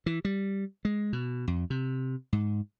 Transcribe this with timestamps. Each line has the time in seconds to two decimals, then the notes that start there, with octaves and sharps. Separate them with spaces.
0.06 E3
0.25 G3
0.85 G#3
1.13 B2
1.48 F2
1.70 C3
2.33 G#2